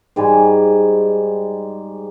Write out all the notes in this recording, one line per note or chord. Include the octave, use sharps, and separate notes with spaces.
G#2 G3 D#4 G#5